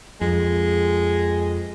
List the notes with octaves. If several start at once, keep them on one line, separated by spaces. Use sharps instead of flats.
F2 G#3